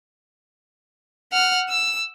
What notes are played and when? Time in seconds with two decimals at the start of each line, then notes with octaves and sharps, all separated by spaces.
1.32 F#5 F6
1.69 E6